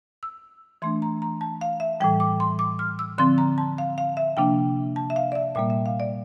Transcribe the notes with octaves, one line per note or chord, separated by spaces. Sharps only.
E6
E3 A3 D4 C6
A#5
A#5
A5
F5
E5
A2 E3 G3 G5
D6
C6
D6
F6
E6
D3 F3 C4 C6
A#5
A5
F5
F5
E5
C3 F3 A#3 D4 G5
A5
E5
F5
D5
E5
A#2 G3 A#3 E5
E5
F5
D5